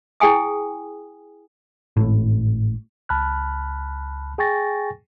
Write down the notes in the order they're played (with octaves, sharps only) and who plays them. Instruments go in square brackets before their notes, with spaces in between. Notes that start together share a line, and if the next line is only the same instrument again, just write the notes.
[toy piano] E4 G#4 G5 G#5 D#6
[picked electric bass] G#1 A2
[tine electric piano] C#2 A5 B5 F6 F#6
G#4 G5 G#5 C#6 A6 A#6